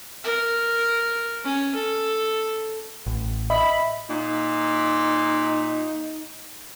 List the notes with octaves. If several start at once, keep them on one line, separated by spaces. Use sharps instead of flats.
A#4
C#4
A4
A1
D#5 E5 B5
A#2 D#4